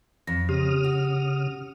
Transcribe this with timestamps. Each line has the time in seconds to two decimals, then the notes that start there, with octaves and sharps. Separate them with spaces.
0.27 F2 A#6
0.49 C#3 G4 D#6 F6
0.84 F#4